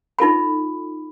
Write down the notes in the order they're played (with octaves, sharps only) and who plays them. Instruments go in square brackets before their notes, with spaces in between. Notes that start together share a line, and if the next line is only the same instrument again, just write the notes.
[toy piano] D#4 F4 A4 B5